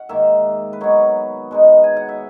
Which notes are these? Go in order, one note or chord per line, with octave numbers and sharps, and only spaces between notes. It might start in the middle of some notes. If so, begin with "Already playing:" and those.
Already playing: F#5
G#2 D#3 A#3 E5
B4
D#3 F#3 B3 C#5
B2 G#3 D#4
G#5
F#5
E5